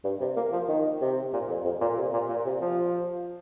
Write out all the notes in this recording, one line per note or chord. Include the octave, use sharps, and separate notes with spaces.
G2
C3
A#3
F3
D#3
C3
A#2
F2
F2
A#2
C3
A#2
A#2
C3
F3